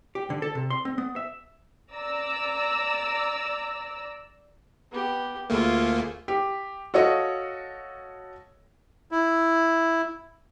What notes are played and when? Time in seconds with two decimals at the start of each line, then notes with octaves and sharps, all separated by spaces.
0.15 G4
0.30 D3
0.42 A4
0.55 C3
0.70 C6
0.85 C4
0.98 B3
1.16 E5
1.94 D5 A#5 E6
4.92 B3 G4
5.50 D2 A3 A#3 F4 G#4
6.28 G4
6.94 F#4 A4 C#5 D#5 F5
9.11 E4